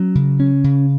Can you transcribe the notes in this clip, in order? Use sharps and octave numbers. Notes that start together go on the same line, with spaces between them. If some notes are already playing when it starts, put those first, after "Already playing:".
Already playing: F#3 C#4
C#3
C#4
C#3